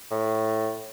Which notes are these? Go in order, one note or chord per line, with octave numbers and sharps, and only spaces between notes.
A2